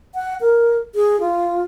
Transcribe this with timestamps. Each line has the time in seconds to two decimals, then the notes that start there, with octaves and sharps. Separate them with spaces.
0.15 F#5
0.41 A#4
0.95 G#4
1.20 F4